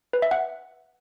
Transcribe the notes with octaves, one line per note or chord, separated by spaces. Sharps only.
B4
E5
F#5